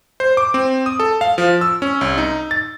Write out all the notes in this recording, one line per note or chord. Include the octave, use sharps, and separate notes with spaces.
C5
D6
C4
D#6
A4
F5
F3
E6
C#4
C2
D#4
A6